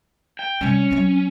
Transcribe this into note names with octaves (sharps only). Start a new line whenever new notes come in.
G5
C3 G3 C#4
F#3 C4